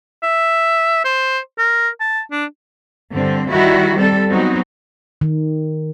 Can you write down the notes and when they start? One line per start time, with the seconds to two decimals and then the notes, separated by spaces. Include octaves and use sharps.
0.23 E5
1.05 C5
1.59 A#4
2.00 A5
2.31 D4
3.13 G2 D3 C4
3.50 D#3 G3 E4 F#4
3.96 G3 C4 A4
4.29 F#3 B3 C4 D#4 F#4
5.21 D#3